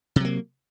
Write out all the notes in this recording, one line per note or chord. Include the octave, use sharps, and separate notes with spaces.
C3 F#3 A#3